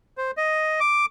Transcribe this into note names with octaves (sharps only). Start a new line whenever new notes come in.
C5
D#5
D6